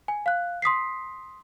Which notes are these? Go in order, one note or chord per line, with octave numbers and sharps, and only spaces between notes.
G#5
F5 F#6
C6 D#6 B6 C7